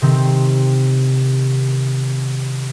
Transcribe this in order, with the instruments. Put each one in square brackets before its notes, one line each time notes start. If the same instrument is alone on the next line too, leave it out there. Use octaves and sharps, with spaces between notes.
[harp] C3 D#3 C4